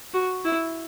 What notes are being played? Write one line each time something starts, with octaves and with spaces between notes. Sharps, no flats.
F#4
E4